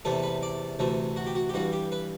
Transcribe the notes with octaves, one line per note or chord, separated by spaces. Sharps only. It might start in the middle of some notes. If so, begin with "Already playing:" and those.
E2 C3 E3 A3 A4
B4
D5
D2 C3 E3 A3
F#4
G4
F#4
G4
G2 E3 G3 F#4
G4
B4